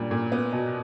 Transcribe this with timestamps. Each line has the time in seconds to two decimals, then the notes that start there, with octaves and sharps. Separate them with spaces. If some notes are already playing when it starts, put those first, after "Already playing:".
Already playing: A#2 G3 D4
0.11 A#2
0.32 B3
0.52 B2